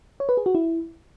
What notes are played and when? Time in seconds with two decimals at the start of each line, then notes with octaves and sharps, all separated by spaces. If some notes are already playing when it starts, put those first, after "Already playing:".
0.20 C#5
0.29 B4
0.37 G#4
0.46 F#4
0.55 E4